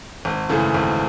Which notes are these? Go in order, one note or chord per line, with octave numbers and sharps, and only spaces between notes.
G#1
F#2 C#3 E3 A3
G#1